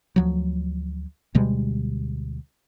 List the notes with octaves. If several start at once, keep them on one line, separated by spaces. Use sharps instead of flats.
D2 F3 F#3
D2 B2 G3 G#3